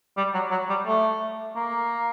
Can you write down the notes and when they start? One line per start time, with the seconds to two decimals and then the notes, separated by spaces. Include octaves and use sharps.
0.17 G3
0.34 F#3
0.51 F#3
0.69 G3
0.87 A3
1.56 A#3